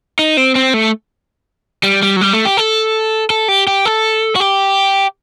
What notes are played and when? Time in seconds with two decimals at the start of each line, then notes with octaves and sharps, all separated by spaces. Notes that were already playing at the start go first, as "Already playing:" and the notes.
0.19 D#4
0.37 C4
0.55 C4
0.74 A3
1.83 G3
2.03 G3
2.16 F#3
2.21 G3
2.33 A3
2.45 G4
2.57 A4
3.30 A4
3.48 G4
3.67 G4
3.85 A4
4.36 F#4
4.40 G4